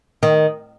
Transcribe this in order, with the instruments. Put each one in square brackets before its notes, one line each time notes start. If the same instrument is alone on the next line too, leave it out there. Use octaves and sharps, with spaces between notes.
[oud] D#3